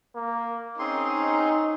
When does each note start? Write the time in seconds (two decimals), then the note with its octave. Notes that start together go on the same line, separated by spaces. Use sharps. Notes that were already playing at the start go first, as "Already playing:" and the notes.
0.16 A#3
0.79 C4 C#4 D#4 G#4 C6